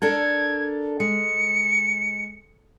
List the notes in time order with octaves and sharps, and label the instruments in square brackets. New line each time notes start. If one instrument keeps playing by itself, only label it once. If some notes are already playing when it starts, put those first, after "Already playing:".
[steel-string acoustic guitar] D4 A4 A#4 [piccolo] G#6
[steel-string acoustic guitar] G#3 [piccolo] C#7